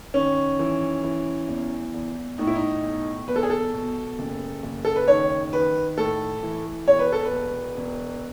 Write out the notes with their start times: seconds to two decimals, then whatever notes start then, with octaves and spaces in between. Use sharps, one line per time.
0.14 D#3 C#4
0.59 E3
1.04 E3
1.49 E2
1.94 E2
2.38 A2 D#4
2.47 E4
2.56 D#4
2.83 B1
3.28 E2 B4
3.36 A4
3.43 G#4
3.50 A4
3.74 B2
4.19 F#1
4.63 F#1
4.85 A4
4.96 B4
5.08 D#3 C#5
5.53 D#3 B4
5.98 A2 A4
6.43 E3
6.88 E1 C#5
6.99 B4
7.12 A4
7.25 B4
7.33 B2
7.77 E1